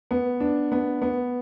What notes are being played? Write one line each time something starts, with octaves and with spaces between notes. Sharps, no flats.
B3
D4
B3
B3